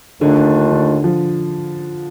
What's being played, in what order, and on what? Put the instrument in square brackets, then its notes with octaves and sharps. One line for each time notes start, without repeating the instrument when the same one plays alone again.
[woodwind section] D#2 D#3 A3 D4 F4 [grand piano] D3
[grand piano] D3
F3